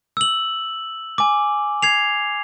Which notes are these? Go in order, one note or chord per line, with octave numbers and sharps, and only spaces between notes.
E6 F#7
G#5 D6
G#6 C7 F7